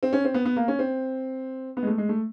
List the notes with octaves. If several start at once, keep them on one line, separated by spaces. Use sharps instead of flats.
C4
C#4
C4
B3
B3
A#3
C#4
C4
B3
G#3
A3
G#3
A3